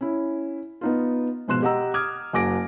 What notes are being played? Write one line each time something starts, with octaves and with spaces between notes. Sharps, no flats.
C#4 E4
B3 D#4 F4
G#2 B2 F3 C6 F#6 E7
G4 D#5 F#5 A#5 E6
D6 D#6 F6 G#6
F#1 F#4 G#5 D6 A#6 D7